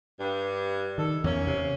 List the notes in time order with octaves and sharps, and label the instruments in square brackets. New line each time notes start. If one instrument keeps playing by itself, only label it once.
[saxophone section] G2
[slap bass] D#3 [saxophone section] A4
[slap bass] E2 [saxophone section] A#3 C#4
[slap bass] C3